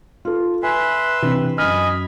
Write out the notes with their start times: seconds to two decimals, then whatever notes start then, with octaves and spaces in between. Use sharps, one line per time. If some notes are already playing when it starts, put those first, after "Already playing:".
0.25 F4 A4
0.63 B4 E5 G#5 C6
1.22 C3 E3 D4
1.58 F#2 D#5 G#5 B5 F6